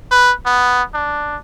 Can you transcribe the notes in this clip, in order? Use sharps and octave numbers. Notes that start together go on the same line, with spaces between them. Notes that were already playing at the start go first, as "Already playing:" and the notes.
B4
B3
D4